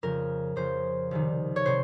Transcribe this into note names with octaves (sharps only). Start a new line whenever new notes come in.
F2 C#3 F3 A#4
F2 C#3 F3 C5
C2 C3 D#3
C#5
C3 D#3 C5